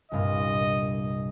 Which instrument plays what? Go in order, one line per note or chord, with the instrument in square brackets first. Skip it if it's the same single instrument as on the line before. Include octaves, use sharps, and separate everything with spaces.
[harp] C2 G2 A#2 [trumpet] D#5